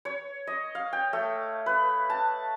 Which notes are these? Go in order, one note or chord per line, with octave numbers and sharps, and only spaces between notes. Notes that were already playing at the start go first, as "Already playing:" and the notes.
C#5
D#5
F5
G5
A3
B4
A5